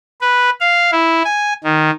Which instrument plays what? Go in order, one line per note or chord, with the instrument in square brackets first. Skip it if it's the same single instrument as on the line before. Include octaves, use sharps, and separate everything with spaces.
[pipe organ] B4
F5
E4
G#5
D#3